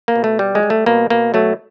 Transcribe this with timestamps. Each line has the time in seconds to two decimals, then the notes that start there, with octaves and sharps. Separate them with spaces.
0.08 A#3
0.16 B2
0.24 A3
0.39 G3
0.55 G#3
0.63 G3
0.70 A3
0.86 B2 A#3
1.10 B2 A#3
1.34 F#3 A3